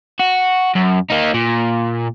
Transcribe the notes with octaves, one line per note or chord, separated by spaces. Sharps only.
F#4
F#2
A#3 D#4
A#2